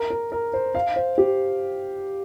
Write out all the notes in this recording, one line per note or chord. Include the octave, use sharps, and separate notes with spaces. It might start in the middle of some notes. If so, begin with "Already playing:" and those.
Already playing: A#4
A#4
A#4
C5
F5
C5
G4